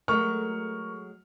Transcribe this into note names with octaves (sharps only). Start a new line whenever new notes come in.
F#3 G#3 A3 A#4 C#6 F6